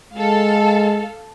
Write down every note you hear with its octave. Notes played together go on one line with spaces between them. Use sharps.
G#3 A4 F5